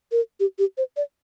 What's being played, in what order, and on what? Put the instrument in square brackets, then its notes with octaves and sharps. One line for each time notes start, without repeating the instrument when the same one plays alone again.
[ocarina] A#4
G4
G4
C5
D5